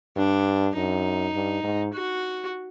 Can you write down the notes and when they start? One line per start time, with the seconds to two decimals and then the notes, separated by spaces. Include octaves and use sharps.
0.16 G2 D4
0.75 F#2 D#4
1.34 G2
1.64 G#2
1.93 F#4